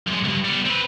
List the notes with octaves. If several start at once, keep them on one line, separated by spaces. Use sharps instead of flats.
F#2 G#3
C2 G2
G3 B3
C4 B4